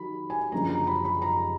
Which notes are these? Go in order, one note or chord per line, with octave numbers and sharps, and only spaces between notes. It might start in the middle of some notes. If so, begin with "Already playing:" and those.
Already playing: D#3 F#3 B5
G#5
F#1 F#2 D3 F3 A#5
A#5
B5
B5
A#5